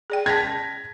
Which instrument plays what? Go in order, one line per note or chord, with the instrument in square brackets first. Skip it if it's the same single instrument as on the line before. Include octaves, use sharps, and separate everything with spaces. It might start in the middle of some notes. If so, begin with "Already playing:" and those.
[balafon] G#4 D5 G5
[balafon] G#4 A5 [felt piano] G#6 A#6 B6